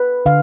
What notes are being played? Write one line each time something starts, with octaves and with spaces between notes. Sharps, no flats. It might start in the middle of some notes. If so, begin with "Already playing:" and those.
Already playing: B4
D3 F5